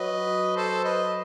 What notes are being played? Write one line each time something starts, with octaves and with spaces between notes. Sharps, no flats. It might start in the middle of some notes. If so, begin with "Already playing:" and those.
Already playing: F#3 B4 D#5
A4 C5
B4 D#5